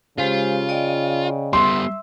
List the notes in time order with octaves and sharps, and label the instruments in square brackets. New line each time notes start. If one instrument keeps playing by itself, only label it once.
[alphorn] C#3 [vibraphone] G#3 G4 C5 [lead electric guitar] F4
[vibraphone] D5 D#5 G5
[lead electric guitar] G3 B3 [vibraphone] E5 E6 [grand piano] C6